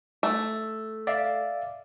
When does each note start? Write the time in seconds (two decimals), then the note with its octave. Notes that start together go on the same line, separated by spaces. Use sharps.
0.23 A3
1.07 D5 E5 F5